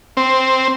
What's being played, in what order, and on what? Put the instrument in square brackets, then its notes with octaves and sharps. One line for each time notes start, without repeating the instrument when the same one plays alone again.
[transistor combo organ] C4